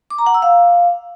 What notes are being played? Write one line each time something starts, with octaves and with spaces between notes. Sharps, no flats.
D6
A#5
F#5
E6
F5